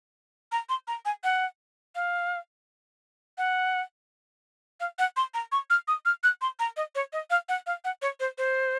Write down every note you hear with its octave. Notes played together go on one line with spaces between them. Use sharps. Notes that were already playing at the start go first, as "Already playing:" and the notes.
A#5
C6
A#5
G#5
F#5
F5
F#5
F5
F#5
C6
A#5
C#6
F6
D#6
F6
F#6
C6
A#5
D#5
C#5
D#5
F5
F#5
F5
F#5
C#5
C5
C5